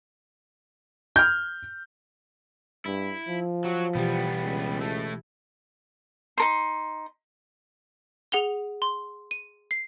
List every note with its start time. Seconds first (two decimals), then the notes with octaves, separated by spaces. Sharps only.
1.16 F6 G6
2.86 G2 E4
3.28 F3
3.64 F#3 F#4
3.95 B2 E3 G3 B3 G4
4.42 C#2
4.81 A3 E4
6.38 D#4 A#4 C6
8.32 G#4 F#5 F7 G7
8.82 C6
9.31 D#7
9.71 C7